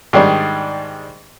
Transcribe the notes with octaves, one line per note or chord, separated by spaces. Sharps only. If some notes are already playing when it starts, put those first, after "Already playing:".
G#2 D#3 G3 D4